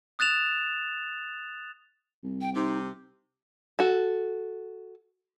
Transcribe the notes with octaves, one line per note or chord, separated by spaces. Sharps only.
D#6 F#6 A6 E7 F7
C2
G5
C3 D#4
F#4 A4